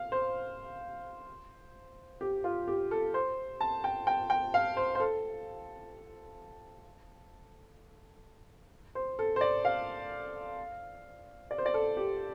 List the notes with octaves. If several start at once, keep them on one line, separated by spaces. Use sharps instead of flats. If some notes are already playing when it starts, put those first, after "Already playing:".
Already playing: F5
C5
G4
F4
G4
A4
C5
A5
G5
G5
G5
F5
C5
C5
A4
C5
A4
C5
D5
F5
D5
C5
D5
A4
G4